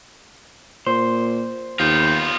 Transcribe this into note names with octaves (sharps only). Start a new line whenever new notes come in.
A#2 C5
D#2 B3 F4 G5